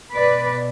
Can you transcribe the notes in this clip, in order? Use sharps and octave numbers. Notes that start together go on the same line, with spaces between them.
B2 B4 D5